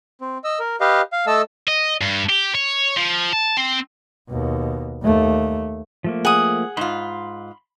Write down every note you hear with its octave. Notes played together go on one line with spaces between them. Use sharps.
C4
D#5 E6
A#4
G4 B4 D#5 F5
F5
A3 A4 D#5 A5 E6
D#5
G2
G4
C#5
F3
A5
C4
D#2 B2
D#2 A3
F3 A3 A#3
G#4 F#5 D#6
G#2 F4 B5 C6